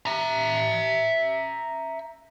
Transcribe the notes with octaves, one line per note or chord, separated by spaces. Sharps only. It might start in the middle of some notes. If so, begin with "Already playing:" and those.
E5 A#5